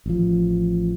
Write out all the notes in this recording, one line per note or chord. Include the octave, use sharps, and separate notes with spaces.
A1 F3